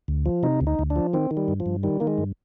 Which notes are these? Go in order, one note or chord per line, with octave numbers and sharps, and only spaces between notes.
D2
F3
C3 D#4
D2
D#4
D2
D4
F3
D#3 C4
D#3
G3
G2
F3
G2
D#3 G3
D#3 A#3
G#3
G2